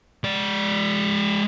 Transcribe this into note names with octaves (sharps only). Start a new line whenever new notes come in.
G#3 D5